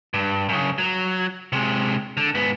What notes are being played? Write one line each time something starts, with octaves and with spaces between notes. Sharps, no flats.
G2
F#2 C#3
F#3
C3 G#3
D3
G#2 B3